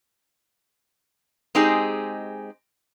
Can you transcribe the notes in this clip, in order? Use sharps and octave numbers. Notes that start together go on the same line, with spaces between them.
G#3 C4 D#4 G4 G#4